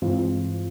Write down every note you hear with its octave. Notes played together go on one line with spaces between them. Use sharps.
G2 E3 G#3 C4 F4